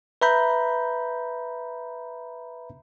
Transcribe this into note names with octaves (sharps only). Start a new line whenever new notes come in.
B4 E5 A#5 B5 G6